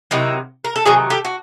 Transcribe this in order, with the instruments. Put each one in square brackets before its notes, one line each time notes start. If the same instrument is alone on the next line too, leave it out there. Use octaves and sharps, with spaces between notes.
[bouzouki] C3 D#3 F#3 E4
A#4
A4
C3 D#3 F#3 F#4 G#4
G4 A4
F#4